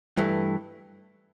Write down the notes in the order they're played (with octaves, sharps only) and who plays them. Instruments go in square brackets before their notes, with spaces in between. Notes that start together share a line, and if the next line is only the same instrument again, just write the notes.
[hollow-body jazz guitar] G2 E3 A3